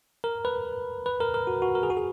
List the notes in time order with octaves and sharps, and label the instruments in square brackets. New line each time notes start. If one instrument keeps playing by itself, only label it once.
[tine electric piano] A#4
B4
B4
A#4
A#4
F#4
F#4
A#4
G#4
F#4
G#4